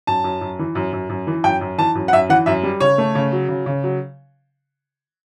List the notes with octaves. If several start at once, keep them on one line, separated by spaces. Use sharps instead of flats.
F#2 A5
F#2
F#2
E3
F#2
F#2
F#2
E3
F#2 G5
F#2
E3 A5
F#2
F#5
F#2 E5
E3 F#5
F#2 E5
G3
C#3 C#5
A3
C#3
F#3
C#3
C#3
F#3